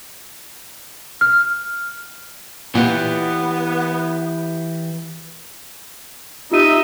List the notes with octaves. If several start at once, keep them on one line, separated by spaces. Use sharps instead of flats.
F6
A#2 E3 B3 G4
D#4 F4 G4 D#5 E5 D#7